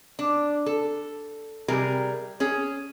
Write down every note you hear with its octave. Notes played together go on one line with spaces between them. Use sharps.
D4
A4
C3 G3 G#4 A#4
C#4 G#4